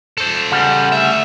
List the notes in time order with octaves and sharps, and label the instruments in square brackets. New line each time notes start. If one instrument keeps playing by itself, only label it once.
[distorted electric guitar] A4 C5
[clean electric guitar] C#3 G3 [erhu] F#5
[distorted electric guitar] D2 E5